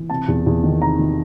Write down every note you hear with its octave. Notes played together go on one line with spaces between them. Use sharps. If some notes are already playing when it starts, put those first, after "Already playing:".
Already playing: E3
C3 A5
E2
E2
D#3
C3 A#5
D#3